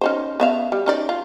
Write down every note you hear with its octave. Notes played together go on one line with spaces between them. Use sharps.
C#4 D#4 C5
B3 E5 F5
G3
C#4 D#4 D5
F4